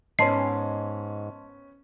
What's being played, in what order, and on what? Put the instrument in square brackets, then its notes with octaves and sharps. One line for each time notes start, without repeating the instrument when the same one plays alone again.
[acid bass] G#2 [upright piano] B3 C#4 [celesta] D#5 A5 C6 [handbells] C7